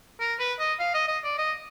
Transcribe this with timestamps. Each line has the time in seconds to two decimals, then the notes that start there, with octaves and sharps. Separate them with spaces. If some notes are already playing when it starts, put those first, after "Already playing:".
0.20 A#4
0.40 B4
0.59 D#5
0.79 F5
0.94 D#5
1.08 D#5
1.24 D5
1.38 D#5